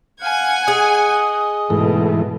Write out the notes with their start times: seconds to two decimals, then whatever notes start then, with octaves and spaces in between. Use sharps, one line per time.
0.22 F5 F#5 G#5 G#6
0.68 G#4 D#5
1.70 G#2 B2 E3 A3